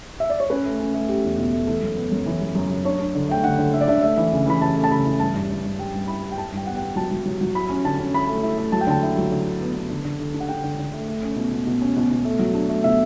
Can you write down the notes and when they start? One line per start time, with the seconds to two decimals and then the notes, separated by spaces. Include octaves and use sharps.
0.20 E5
0.30 D5
0.40 C#5
0.50 C#4 B4
0.65 A3
0.80 C#4
0.94 A3
1.08 C#4 G4
1.24 E2
1.38 B2
1.53 A3
1.67 E3 A4
1.83 F#2
1.97 B3
2.12 F#2
2.26 E3
2.41 F#2
2.55 F#2
2.70 F#2
2.85 D4 C#5
3.00 D4
3.15 D3
3.29 A3 G5
3.44 D3 F#5
3.58 D3
3.73 D3 E5
3.81 D5
3.88 D4 E5
4.02 A3 E5
4.17 E3
4.33 C#3
4.47 E3 B5
4.61 E3 A5
4.76 A3
4.84 A5
4.91 C#3 B5
5.05 E3
5.20 G2 A5
5.35 G2
5.50 G2
5.65 G2
5.79 G2 G5
5.94 G2
6.08 E4 B5
6.22 E4
6.32 G5
6.38 E4 A5
6.52 G2
6.57 G5
6.67 B3 F#5
6.77 B3 G5
6.96 F#3 A5
7.11 F#3
7.26 F#3
7.41 F#3
7.55 E4 B5
7.70 C#4
7.84 D3 A5
7.99 C#4
8.14 E4 B5
8.29 A3
8.43 E4
8.58 A3
8.72 F#3 A5
8.81 G5
8.87 D3 A5
9.03 E4
9.17 F#3
9.31 D3
9.46 E4
9.61 B3
9.75 B3
9.90 D3
10.05 D3
10.20 D3
10.34 D4
10.40 F#5
10.49 D4 G5
10.64 D3
10.79 D3
10.93 A3
11.08 A3
11.22 C#4
11.36 B2
11.51 B2
11.67 B2
11.82 C#4
11.96 B2
12.11 B2
12.25 A3
12.39 F#3
12.54 D4
12.69 A3
12.84 B2 E5